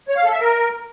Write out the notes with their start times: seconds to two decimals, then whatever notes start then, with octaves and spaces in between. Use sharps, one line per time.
0.08 C#5
0.16 F5
0.24 A4
0.32 E5
0.40 A#4